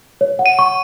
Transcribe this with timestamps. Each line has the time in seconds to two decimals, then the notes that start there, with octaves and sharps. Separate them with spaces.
0.21 C#5
0.39 F#5
0.46 D#7
0.59 C#6